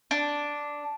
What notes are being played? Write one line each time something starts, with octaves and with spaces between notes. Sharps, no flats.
D4